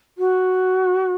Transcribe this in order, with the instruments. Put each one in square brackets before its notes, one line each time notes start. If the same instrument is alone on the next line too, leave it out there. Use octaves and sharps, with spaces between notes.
[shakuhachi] F#4